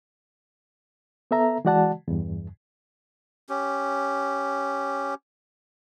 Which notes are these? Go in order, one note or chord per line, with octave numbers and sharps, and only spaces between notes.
B3 A4 E5 A#5
E3 G#3 F#4 D5 F#5 A5
E2 G2
C#4 G4